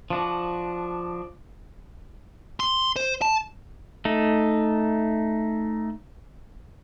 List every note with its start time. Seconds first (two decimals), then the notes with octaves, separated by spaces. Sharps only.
0.10 F3 D4 F#4
2.60 C6
2.96 C5
3.22 A5
4.05 A3 D#4